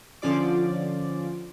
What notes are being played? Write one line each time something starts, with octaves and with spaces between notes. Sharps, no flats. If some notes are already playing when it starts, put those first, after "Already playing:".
D3 F3 C#4 F4 D5 D6